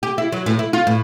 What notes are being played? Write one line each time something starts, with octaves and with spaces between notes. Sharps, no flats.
G4
E4
F#3
A2
E4
F4
A2